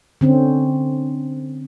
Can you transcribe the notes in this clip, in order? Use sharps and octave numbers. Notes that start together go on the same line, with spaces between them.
D3 C4 C#4